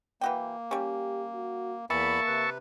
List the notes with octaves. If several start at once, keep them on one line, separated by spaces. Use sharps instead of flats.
E3 A#3 F#4 G5
G3 C#4 G4
F#4
E2 E3 A#3 E5 A5 B5 C#6
C3 B4